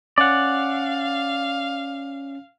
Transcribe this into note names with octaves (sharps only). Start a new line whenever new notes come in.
C#4 D5 F5 F#5